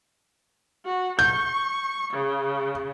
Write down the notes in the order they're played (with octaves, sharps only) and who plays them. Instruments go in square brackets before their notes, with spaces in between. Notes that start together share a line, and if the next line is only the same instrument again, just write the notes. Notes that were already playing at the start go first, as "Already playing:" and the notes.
[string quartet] F#4
[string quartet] C#6 [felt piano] G6
[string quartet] C#3